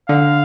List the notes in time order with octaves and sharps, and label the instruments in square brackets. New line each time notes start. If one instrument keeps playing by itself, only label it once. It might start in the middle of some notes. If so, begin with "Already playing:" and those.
[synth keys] D3 [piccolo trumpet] F5